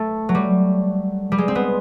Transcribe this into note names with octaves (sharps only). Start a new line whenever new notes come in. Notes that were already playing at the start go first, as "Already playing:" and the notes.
Already playing: A3
F#3
G3
G3
G#3
C4
B3